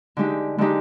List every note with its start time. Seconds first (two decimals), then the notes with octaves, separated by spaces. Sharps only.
0.17 D3 G#3 D#4 G4
0.58 D3 G#3 D#4 G4